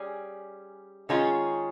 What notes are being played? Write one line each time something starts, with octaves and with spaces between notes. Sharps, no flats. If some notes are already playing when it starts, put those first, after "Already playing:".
Already playing: G3 C#4 G#4
D#3 G#3 C#4 F4 G#4